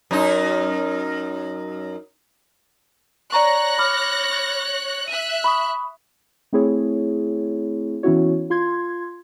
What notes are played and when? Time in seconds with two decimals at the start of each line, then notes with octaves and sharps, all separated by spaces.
0.11 F#2 D#4
3.32 C#5 D5 A#5 C#6 F#6 A#6
3.78 B5 D6 F6
5.08 E5 F#6 D#7
5.44 B5 C#6 D#6
6.53 A3 C4 E4 G#4 C#5
8.03 E3 B3 C#4 E4 F#4 C#5
8.50 F4 C6 G#6